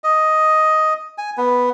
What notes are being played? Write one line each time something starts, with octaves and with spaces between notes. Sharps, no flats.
D#5
G#5
B3